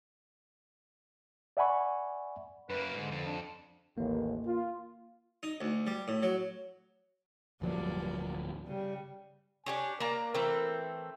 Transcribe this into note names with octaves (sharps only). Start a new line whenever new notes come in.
D5 E5 F#5 G#5 B5 C#6
F#2 A#3 B4
G#2 D3
F2
D4
A1 D#2 A#3
F4
D#4
D2
G3
A2
F#3
D1 G2 F3 F#3 A#3 D5
C#3 G3
D4 G4 C#5 G#5
A#3 D4 A#4 A#5
E3 A3 C4